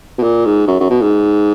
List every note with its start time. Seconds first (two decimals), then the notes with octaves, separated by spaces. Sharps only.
0.18 B2
0.23 A#2
0.45 G#2
0.67 F#2
0.80 F#2
0.90 B2
1.02 G#2